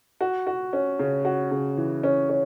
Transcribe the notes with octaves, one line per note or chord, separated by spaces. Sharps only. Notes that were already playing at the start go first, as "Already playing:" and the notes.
F#4
F#4
C#4
C#3
F#4
C#3
E3
C#4
C#4